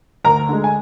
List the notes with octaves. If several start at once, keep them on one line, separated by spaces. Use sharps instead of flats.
D2 A#4 A#5
D3 G#3
G#5